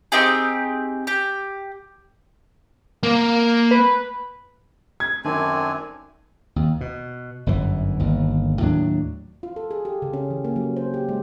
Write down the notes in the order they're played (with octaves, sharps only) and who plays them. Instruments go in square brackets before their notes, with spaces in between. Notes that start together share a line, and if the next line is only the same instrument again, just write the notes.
[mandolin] C4 D#4 G4 G#4
G4
[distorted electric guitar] A#3
[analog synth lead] B4
[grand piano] G#6
[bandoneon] F#2 G#5 [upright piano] D#3 [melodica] A3 C4 D4
[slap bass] D#2
B2
G1 F#2 E3
G1 D#2
D#2 A2 F#3 D4
[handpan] F4
A4
G#4
G4
C#3
C#4
E3
A#3
F#3
C5
G4
G#3